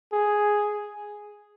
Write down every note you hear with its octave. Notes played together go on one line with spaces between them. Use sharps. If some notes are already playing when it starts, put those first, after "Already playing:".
G#4